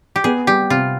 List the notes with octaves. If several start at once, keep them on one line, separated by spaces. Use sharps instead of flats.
G4
B3 G#4
G3 G4
C3 F4